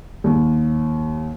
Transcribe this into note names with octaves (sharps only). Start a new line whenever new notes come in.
D#2